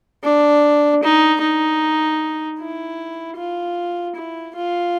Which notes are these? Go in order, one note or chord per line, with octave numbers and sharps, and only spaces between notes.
D4
D#4
D#4
E4
F4
E4
F4